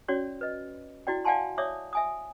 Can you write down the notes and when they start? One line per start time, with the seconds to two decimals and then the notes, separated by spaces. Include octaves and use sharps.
0.08 C#4 F#4 C#5 D5
0.41 B4 D#5
1.07 E4 F#4 D5 G5
1.25 D5 F5 F#5 G#5 A5 C6
1.58 C#5 D5 E5 D6 D#6
1.93 E5 G#5 D#6